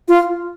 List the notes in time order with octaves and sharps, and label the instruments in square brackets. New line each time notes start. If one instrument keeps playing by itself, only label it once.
[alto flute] F4